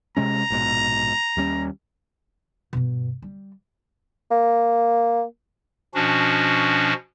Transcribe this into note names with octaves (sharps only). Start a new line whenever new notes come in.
C3 G#3 C#4 A#5
A#1 G#2 B2
D#2 G3 C#4
G2 B2
G3
A#3
B2 F3 C#4 D4 F#4